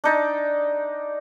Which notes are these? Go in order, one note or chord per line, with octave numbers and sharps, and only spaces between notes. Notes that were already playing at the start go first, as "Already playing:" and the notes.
D4 D#4 D5